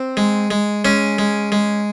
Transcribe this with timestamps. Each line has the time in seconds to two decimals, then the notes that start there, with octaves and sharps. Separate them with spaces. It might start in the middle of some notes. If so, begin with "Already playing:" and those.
Already playing: C4
0.17 G#3
0.51 G#3
0.85 G#3 C#4
1.19 G#3
1.52 G#3